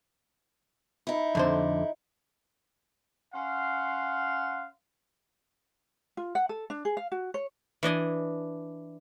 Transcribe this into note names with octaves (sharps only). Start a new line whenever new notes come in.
D#4 E4
F2 D3 C5
C#4 F5 F#5 C6
F4
F#5
A4
D4
G#4
F5
F#4
C#5
E3 D4 D#5 G#5